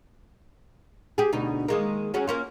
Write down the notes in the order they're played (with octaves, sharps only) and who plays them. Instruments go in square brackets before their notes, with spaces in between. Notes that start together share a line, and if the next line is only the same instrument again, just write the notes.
[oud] G4 G#4
D2 B2 D#4
D#3 G#3 A#3
F#3 C#4 G#4
A#3 C#4 F4